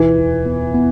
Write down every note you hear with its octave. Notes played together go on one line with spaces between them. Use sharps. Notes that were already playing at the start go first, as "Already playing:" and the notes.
Already playing: D2 B2 E3
E2
B3
B3